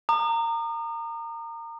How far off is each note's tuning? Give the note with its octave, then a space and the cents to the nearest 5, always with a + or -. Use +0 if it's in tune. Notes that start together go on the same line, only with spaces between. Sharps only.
A#5 -20 D#6 -40